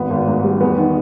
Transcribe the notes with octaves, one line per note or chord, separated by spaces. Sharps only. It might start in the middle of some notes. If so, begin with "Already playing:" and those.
Already playing: G#1 B3
G#1
G#2
G3
E2 B3
D#3